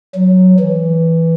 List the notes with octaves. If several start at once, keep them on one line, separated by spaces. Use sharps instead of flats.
F#3
E3